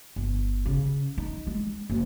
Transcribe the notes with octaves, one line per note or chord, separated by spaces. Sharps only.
G1
C#3
D#4
G#3
F#1